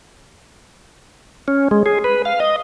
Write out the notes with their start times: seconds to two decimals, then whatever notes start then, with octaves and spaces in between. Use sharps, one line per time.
1.48 C#4
1.71 G#3
1.86 G#4
2.04 B4
2.25 F5
2.40 D#5